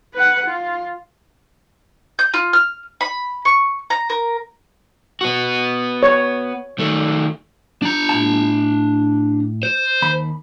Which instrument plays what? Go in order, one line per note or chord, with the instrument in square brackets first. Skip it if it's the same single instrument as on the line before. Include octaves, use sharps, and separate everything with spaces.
[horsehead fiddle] B4 F#5
F4
[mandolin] G6
F4
F6
B5
C#6
A#5
A#4
[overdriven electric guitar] B3 F#4
[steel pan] C#5
[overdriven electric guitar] D#3 A3
D4 A#5
[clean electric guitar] A2 A5
[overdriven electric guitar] C5
[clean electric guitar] D#2 B5